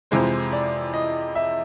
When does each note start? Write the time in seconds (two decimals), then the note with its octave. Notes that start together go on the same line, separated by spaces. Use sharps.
0.11 F2 C3 E3 G#3 C5
0.52 D5
0.94 D#5
1.35 E5